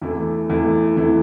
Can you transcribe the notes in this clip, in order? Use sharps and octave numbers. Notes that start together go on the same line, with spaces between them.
E2 E3 A3
E2 E3 A3
E2 E3 A3